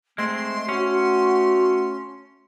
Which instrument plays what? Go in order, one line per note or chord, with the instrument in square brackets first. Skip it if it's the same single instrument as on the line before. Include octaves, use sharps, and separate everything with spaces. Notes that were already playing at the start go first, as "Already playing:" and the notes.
[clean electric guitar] G#3 C4 [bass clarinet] A3 [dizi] C6
[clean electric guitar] C#4 [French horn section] F#4